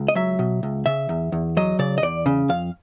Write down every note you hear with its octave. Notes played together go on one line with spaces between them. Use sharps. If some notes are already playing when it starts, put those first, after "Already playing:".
Already playing: C#2
D#5
F#3 E5
B2
C#2
C#3 E5
E2
E2
F#3 D#5
C#3 D5
D#5
E2 D5
C#3
F2 F5